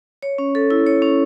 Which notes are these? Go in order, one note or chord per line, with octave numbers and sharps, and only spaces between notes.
C#5
C#4
A4
E4
C#5
C#4